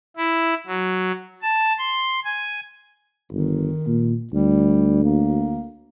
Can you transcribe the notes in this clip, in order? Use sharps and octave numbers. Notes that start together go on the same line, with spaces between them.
E4
F#3
A5
C6
G#5
G1 D#3
A#2
D2 G3
A#3